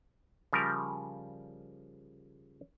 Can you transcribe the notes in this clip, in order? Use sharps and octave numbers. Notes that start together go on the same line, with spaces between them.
C#3 F3 G3 A#4